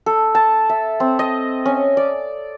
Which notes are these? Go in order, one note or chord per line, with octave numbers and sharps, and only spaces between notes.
A4
A5
E5
C4
D#5
C#4
D5